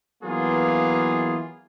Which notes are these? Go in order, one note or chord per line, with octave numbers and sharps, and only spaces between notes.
E3 F#3 A#3 B3 F4 G#4